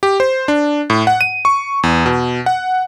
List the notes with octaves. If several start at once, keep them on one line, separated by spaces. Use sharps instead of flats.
G4
C5
D4
A2
F#5
D#7
C#6
E2
B2
F#5